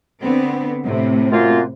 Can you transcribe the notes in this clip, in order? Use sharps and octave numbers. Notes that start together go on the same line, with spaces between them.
D3 B3 C4
A2 C3
F#2 A#3 F4